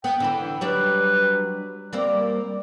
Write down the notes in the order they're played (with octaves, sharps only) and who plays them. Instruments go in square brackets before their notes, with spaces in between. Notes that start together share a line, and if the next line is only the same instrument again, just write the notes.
[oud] B3 [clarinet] G5
[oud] D3 E3 B4
[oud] F#3 G3 D4 [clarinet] B4
[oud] G3 A#3 C4 [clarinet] D5